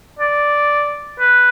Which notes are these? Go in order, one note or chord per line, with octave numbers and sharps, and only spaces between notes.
D5
B4